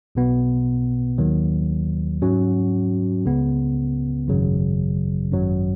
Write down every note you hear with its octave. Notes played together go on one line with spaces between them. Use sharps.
B1 B2 B3
D#2 D#3 F#3
G#2 F#3 C#4 F#4
C#2 C#3 B3
G#1 F#2 C#3 F#3
G#1 F#2 F#3